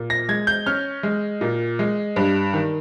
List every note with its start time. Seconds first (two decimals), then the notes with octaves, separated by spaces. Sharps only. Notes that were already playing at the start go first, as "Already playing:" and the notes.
Already playing: A#2
0.10 A#6
0.29 G#3 G#6
0.47 G6
0.66 C#4 F6
1.03 G#3
1.41 A#2
1.79 G#3
2.16 G2
2.53 D#3